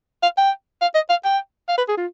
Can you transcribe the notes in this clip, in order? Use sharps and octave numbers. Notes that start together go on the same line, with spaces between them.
F5
G5
F5
D#5
F5
G5
F5
B4
G#4
F4